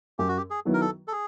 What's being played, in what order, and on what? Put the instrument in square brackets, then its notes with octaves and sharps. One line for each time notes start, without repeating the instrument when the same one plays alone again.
[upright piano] F#2 [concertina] G4
[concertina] F#4
G4
G#4
[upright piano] D#3 F#3 B3 E4
[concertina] A#4
A4
A4
G#4